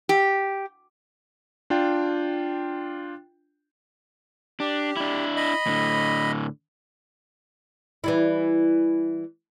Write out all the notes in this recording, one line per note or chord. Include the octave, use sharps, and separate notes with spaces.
G4
D4 F4 G5
D4 G4
D4 E4
D#5 B5
A2 D3
E3 G3 E4